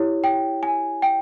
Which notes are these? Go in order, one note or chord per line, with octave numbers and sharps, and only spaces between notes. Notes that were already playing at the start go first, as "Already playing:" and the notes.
Already playing: E4 G4 C#5
G5
G#5
G5